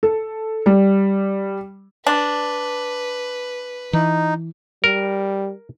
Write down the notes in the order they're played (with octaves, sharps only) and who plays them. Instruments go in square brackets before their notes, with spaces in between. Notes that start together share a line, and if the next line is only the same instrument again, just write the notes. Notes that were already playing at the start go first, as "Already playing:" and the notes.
[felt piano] A4
G3
[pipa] D4 [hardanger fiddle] B4
[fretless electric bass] E3 [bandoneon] D#4
[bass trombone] G3 [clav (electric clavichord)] A#4